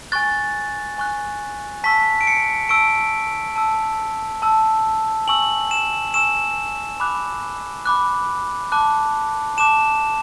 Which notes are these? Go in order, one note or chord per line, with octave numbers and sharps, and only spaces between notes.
G#5 C#6 F#6 A6
G#5 C#6 F#6
A5 C#6 E6 B6
D7
C#7
A5 C#6 E6 D7
A5 E6
A5 E6
G#5 C#6 E6 F#7
E7
G#5 C#6 E6 E7
B5 D6 F#6
B5 D6 F#6
A5 D6 F#6
A5 D6 F#6 E7